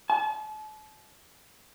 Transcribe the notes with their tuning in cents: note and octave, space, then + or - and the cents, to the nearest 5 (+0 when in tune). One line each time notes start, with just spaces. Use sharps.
A5 -40